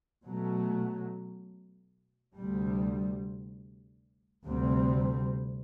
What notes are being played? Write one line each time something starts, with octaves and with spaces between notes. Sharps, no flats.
B2 F#3 A3
D2 C3 G3
D2 C3 G3 C4